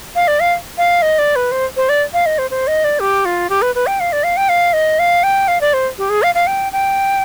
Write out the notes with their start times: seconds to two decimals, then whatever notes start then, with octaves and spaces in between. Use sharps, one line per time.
0.15 F5
0.28 D5
0.40 F5
0.78 F5
1.02 D#5
1.19 D5
1.36 B4
1.52 C5
1.77 C5
1.89 D5
2.13 F5
2.26 D#5
2.38 C5
2.51 C5
2.67 D#5
2.84 D5
3.00 G4
3.25 F4
3.50 G4
3.62 B4
3.75 B4
3.87 G5
4.00 F5
4.12 D5
4.24 F5
4.37 G5
4.49 F5
4.73 D#5
4.99 F5
5.23 G5
5.48 F5
5.61 D5
5.73 C5
5.98 G4
6.09 G#4
6.23 F5
6.35 F5
6.47 G5
6.72 G5